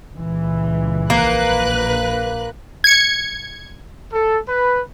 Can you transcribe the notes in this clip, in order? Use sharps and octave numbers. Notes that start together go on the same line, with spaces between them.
C#2 A#2 E3
A#1 A#3 B4 F#6
G#6 C#7
A4
B4